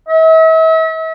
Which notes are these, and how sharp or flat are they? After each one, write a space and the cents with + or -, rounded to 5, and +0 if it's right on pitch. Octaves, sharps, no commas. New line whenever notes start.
E5 -40